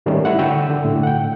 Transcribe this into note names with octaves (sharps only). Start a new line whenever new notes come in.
G#2 D#3 G3 A3 C#4
E4 F#5
D3 F#4 G5 E6
D3
A2
F#5 G5